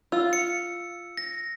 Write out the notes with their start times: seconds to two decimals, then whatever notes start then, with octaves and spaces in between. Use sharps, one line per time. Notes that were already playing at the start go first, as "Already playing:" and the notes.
0.12 F4 E6
0.33 C#7
1.17 A#6